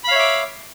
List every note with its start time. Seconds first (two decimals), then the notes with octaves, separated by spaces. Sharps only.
0.04 B5
0.08 F5
0.12 C#5
0.15 E5
0.19 D6